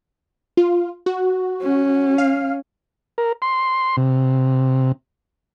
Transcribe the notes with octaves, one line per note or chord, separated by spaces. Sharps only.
F4
F#4
C#4
F5
A#4
C6
C3